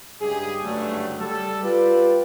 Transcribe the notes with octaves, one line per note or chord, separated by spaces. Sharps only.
G2 C#3 G#3 G4 G#4
F#1 G2 D3 F#3 G3 A3
G3 A4
F4 G4 B4 D5